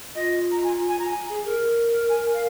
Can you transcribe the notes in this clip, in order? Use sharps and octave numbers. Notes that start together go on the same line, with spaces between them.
F4 D#5
A#5
G#5
G#5
A#5
G#5
G#4
A#4
G#5
F5